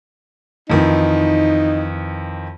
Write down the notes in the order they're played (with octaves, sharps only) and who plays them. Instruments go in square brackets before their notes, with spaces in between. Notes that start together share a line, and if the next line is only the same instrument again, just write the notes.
[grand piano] F2 D#3 E3 [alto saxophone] D#4